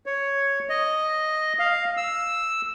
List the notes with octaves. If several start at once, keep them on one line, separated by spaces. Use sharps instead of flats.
C#5
D#5
F5
E6